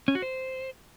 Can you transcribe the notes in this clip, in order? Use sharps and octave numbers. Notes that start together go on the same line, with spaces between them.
C#4
F#4
C5